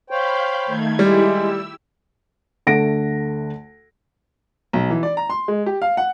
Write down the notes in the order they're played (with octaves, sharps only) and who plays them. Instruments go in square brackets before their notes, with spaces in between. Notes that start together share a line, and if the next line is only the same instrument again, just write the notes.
[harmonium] C5 C#5 G5 [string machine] F5 B5 G6
[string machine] D#3 A3 G#6
[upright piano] G3 [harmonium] G#3 [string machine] E4 G4
[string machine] E6
[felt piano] D2 A3 F#5 A#6 D7
[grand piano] B1
E3
D5
A#5
C6
G#3
G4
F5
F#5